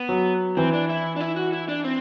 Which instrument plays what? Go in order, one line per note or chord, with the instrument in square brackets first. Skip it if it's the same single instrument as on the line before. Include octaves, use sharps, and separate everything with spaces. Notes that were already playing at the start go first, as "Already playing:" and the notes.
Already playing: [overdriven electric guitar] B3
[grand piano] F#3
[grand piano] E3 [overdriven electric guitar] C4
[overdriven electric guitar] D4
E4
D4
E4
F#4
E4
D4
C4